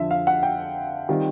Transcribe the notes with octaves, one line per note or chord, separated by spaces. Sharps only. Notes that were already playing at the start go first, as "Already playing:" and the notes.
Already playing: F2 D3 F3 E5
F5
F#5
G5
D#3 G3 C4 F4